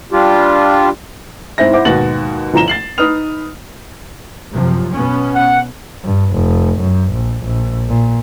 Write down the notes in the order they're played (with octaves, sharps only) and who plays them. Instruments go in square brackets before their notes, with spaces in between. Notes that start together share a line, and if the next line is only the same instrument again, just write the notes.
[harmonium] G3 D4 F4 G4
[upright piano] G#2 C4 E4 A#6
E4 C5 F#5 D6
D#2 G#2 B2 F#4 A6 F#7
G1 F3 A#5 E7 G7
A6 C7 F#7
D#4 B4 D#6 F6 F7
[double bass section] F#2 C3 F3
B2 B3 C#4
[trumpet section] F#5
[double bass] G2
F1
F#2
A#1
A#1
A#2